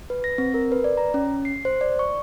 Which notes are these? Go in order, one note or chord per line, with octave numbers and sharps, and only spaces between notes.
B4
A#6
C4
A#4
B4
D5
A#5
C#4
C7
C5
D5
C#6